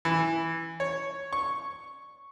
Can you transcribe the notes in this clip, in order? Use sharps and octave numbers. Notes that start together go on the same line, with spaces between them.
E3
C#5
C#6